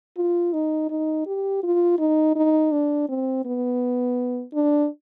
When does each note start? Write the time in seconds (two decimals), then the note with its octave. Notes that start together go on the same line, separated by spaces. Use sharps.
0.17 F4
0.53 D#4
0.90 D#4
1.27 G4
1.63 F4
1.99 D#4
2.36 D#4
2.72 D4
3.09 C4
3.45 B3
4.54 D4